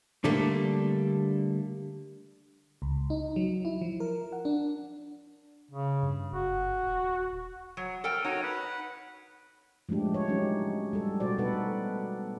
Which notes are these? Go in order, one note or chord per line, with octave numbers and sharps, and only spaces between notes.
D3 G3 A3 A#3 D4
C#2
D#4
F#3
E4
F3
A#4
F#5
D4
C#3
G2
F#1 F#4
D#1
F#3
A4 A#4 G5
D#4 F#4 C#5
B4 F#5
F3 G#3 A3 D4 G4
C#5
F#3 G#3 C#4 D#4 G4
G3 A4
B2 F#4 C5 D5
B2 D#4 A4 B4 F#5